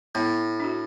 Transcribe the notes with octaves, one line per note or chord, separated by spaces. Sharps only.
A2 B3
D4 F#4